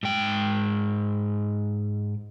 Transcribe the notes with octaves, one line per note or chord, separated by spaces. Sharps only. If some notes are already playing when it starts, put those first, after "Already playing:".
G#2 G5